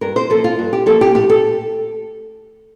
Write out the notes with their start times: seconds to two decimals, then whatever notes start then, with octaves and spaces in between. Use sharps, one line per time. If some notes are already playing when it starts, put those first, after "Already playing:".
0.01 G2 A#4
0.16 C5
0.30 F3 A#3 A4
0.44 F4
0.59 G2
0.73 G4
0.86 F3 A#3 A4
1.01 G4
1.14 A2 G4
1.30 A4